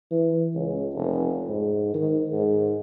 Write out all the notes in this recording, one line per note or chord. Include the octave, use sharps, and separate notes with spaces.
E3
C#2
F1
G#2
D#3
G#2